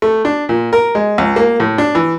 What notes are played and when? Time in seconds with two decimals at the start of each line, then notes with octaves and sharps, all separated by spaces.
0.02 A3
0.25 D4
0.49 A#2
0.73 A#4
0.95 G#3
1.18 C#2
1.36 A#3
1.60 A2
1.78 D4
1.95 E3